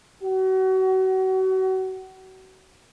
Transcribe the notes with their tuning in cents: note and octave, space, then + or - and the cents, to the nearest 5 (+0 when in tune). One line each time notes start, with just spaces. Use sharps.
F#4 +35